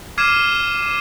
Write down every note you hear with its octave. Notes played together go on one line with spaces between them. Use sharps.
D6 F6 G#6 C7 D#7 E7